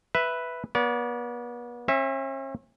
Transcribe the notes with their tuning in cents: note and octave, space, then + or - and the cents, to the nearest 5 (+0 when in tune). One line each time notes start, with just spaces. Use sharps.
B4 +0 E5 +0
B3 -40 D5 -35
C#4 -45 E5 +0